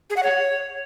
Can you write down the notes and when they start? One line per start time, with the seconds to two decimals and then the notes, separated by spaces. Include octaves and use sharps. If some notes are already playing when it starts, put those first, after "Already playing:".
0.10 G#4
0.17 F#5
0.23 C#5